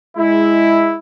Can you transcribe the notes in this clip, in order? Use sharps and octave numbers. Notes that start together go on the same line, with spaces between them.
G#3 E4